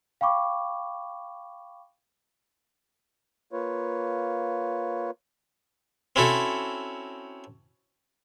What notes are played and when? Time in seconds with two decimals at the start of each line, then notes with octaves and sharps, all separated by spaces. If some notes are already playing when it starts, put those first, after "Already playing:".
0.21 F5 G5 B5 C#6 D6
3.53 A#3 F4 B4 C#5
6.16 C4 C#4 E4 F#4 A4